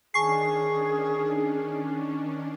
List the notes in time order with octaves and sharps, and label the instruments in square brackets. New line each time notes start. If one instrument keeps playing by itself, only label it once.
[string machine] D#3 C#4 D4 [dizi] G#4 [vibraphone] G#5 A5 [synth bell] C#6 C7